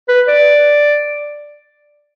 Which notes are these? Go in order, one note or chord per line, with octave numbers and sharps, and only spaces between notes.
B4
D5